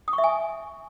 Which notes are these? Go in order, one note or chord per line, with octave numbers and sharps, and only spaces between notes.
D#6
C#6
E5
G#5